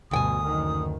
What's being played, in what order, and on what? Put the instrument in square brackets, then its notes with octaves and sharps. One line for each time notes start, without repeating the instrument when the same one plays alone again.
[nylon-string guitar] D2 G5 G#5 [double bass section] G2 B2 [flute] D#6
[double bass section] F#1 D#3